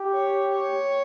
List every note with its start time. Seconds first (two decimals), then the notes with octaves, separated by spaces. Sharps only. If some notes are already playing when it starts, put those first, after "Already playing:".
Already playing: G4
0.12 C#5
0.50 C#5